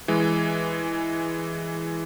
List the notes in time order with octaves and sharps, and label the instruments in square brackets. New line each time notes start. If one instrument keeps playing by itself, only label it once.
[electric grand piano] E3 G#3